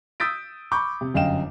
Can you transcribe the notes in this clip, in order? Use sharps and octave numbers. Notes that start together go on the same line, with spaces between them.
D#6 E6 G6 A6 B6 D7
B5 C#6 D6 G6
C3
G1 F#2 D#5 F5 G5 E7